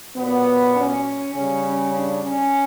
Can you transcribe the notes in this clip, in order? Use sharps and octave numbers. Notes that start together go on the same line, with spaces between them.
A#2 F#3 B3
C#4
C#3 G3 C#4
C#4
D4
C#4